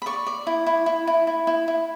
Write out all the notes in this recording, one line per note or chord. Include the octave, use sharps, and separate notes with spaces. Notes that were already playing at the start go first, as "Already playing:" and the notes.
B5
D5 C#6
D5
E4
E4
E4
E4
E4
E4
E4